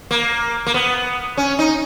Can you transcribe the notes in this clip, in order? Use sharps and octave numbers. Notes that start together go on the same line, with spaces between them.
A#3
A#3
B3
C#4
D#4